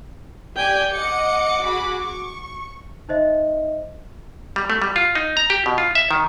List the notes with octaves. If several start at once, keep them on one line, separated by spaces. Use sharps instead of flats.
G4 D5 G5 G#5
D#5 F#5 D6 C#7
F#4 G#4 B5
C#6
D#4 C5 D#5 E5
G3
A3
G3
F4
D#4
A#5
G4
B2
F4
E5
D#3